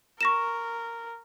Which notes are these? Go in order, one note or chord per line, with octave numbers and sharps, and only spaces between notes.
A#4 C#6 A#6 E7